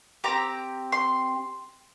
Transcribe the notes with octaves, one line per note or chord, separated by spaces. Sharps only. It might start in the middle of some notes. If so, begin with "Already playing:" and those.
C4 G4 A#5
C6